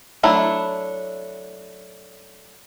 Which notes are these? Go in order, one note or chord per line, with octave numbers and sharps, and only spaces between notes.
F#3 A3 D4 E4